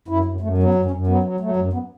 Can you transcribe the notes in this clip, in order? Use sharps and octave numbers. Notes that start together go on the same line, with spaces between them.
F#2 E4
F#2
F#2 A3
F#3
B3
F#2
C#4
F#2
F#3 B3
F#3
F#3 A3
F#2
B3